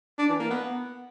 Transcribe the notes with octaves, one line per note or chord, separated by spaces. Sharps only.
D4
E3
A#3
B3